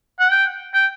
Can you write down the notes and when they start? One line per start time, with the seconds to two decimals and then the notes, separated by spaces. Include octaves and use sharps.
0.19 F#5
0.32 G5
0.74 G5